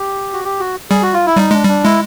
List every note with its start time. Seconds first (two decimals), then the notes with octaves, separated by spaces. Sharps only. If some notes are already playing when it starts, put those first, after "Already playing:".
Already playing: G4
0.33 F#4
0.45 G4
0.60 F#4
0.90 G3 G#4
1.02 F#4
1.14 F4
1.26 E4
1.37 G3 D#4
1.51 G#3 D4
1.64 G3 D4
1.84 G#3 E4